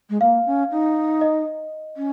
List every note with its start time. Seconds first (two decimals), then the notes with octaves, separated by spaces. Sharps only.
0.10 G#3
0.21 A#3 F5
0.46 C#4
0.71 D#4
1.21 D#5
1.97 C#4